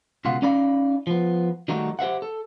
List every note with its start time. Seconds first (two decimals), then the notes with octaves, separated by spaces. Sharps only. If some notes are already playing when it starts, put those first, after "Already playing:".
0.25 C#2 B2 F4 F#5
0.42 C#4 D#4 D5 F5 B5
1.07 F3 B3
1.68 D#3 F#3 G3 A3 D#4 F#4
1.99 G4 C5 E5 F#5
2.22 A4